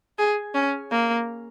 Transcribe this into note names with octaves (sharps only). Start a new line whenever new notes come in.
G#4
C#4
A#3